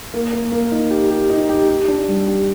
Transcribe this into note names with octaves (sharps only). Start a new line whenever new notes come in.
A#3
A#3
A#3
D#4
G4
G4
D#4
G4
G4
D4
G3
G4